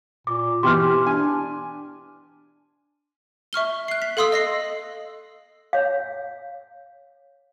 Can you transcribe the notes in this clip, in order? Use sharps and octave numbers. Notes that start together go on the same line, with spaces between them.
A#2 D6
B2 E3 G4 C6 F6
D4 G#5
E5 C#6 F6 G7
F#6 C7
B6
A4 F5 C6 D#6 E6
D#5 A#6 C7
C#5 F5